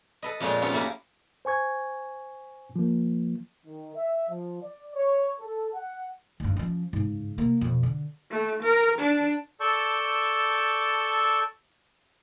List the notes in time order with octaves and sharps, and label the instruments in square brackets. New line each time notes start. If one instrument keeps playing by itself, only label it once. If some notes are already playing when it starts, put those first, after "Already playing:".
[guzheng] A4 B4 D#5
F2 A#2 G#3 F4 C#5 G5
B3 C#4 D#4 F4 G4 A4
A#3 E4 F#4 G4 A#4 B4
[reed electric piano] C5 G#5 C#6 G#6
F3 A#3
[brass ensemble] D#3
E5
F3
D5
C#5
A4
F#5
[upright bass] D2 G2
F3 C#4
G#2 C#3
C3 A#3
F2 B2
D3
[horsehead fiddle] A3
A#4
D4
[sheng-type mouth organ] A4 D5 A5 C#6 E6 G6